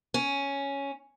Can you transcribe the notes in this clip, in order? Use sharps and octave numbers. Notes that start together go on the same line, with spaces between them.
C#4